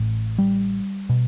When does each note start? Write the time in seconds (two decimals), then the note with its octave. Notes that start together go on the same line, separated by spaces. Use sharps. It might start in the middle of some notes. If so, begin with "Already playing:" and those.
Already playing: A1 A2
0.38 G3
1.09 B2